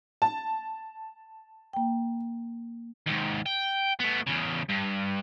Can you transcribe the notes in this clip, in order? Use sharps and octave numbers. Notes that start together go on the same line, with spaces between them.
A5
A#3 G5
D#2 G#2
G5
A2 B3
E2 C#3
G2